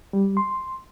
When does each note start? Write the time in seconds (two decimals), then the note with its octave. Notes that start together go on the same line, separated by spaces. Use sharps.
0.13 G3
0.37 C6